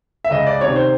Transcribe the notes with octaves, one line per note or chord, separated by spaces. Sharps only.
E5
C#2 D#5
D5
C3 D#3 C#5
C5